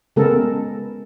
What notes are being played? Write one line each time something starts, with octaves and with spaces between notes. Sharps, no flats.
C#3 G#3 B3 A4 A#4